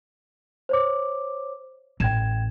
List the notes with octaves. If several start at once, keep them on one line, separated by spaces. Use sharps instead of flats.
C5 C#5 D6
A1 G5 G#6 E7